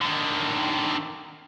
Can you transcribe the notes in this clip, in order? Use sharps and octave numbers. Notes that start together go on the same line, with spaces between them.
D3 D#3